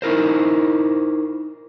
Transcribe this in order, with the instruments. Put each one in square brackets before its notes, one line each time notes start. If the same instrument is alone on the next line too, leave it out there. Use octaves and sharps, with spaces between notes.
[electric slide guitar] D#4 E4 A#4 C5